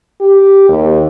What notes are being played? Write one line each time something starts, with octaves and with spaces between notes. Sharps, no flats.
G4
D#2